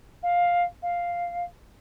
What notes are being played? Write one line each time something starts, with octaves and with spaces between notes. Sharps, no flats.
F5
F5